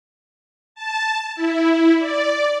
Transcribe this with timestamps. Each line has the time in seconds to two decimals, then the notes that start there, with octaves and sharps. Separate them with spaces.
0.75 A5
1.36 E4
1.99 D5